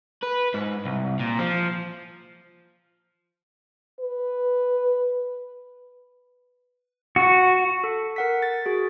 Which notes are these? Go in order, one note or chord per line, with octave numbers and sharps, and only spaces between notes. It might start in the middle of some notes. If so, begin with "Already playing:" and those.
B4
G#2
C2
A#2
F3
B4
F#4
A4
A#4 F#5 B6
A6
F#4 G#4